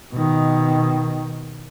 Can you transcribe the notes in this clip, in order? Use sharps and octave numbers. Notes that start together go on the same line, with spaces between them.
B2 D#3